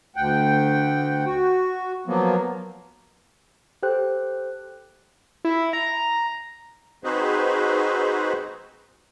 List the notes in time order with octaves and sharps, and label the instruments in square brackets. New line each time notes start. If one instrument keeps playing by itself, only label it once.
[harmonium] D2 F#5 G5
F#4
F3 F#3 A#3 B3
[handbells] G4 A4 C5 G5 F#6
[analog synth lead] E4
A#5
[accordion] C4 D#4 F#4 G#4 B4 C5